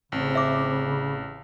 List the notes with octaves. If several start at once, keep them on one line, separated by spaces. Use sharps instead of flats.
A1 C#3 C4
E5 D6